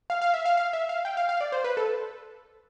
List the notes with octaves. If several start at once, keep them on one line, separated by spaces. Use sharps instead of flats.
F5
F5
E5
F5
F5
E5
F5
G5
F5
F5
D5
C5
B4
A4